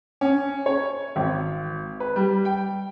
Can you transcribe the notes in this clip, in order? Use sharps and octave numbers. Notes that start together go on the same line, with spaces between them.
C#4
C#5
G#1
B4
G3
G5